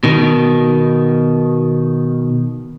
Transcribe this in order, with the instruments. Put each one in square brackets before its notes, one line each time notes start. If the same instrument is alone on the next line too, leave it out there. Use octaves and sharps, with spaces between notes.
[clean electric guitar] B2 D#3